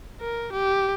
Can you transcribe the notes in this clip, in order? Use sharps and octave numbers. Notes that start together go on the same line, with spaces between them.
A#4
G4